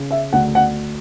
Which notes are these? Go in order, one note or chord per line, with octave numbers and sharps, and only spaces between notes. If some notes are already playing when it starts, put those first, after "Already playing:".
Already playing: C#3
E5
D2 F#5
F#5